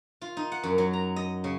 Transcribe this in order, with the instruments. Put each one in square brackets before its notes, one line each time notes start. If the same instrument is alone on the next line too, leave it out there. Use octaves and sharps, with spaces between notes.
[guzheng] F4
D#4
F#5
F#2
F#3
A#5
D#5
C#3